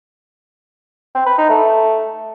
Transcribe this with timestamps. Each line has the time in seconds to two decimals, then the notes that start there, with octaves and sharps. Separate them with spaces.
1.15 C4
1.26 B4
1.38 D#4
1.49 A3